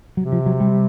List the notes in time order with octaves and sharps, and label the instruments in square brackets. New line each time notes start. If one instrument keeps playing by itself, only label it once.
[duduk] C3 [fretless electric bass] F#3
[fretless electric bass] F3
F#3
G3